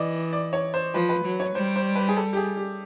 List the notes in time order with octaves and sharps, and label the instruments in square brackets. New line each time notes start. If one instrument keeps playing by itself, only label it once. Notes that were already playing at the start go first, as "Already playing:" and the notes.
Already playing: [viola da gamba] E3 [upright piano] D5 D#5
[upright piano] D5
C#5
C5
[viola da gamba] F3 [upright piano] B4
[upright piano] B4
[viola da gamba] F#3
[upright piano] C#5
[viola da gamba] G3 [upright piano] C5
[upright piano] C5
B4
G#4
A4
G4
G#4
G4